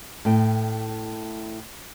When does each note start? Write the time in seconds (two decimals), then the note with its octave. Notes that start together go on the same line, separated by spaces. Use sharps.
0.25 A2 G5